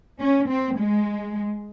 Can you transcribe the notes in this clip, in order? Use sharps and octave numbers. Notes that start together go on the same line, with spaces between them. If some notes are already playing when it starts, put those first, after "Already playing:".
C#4
C4
G#3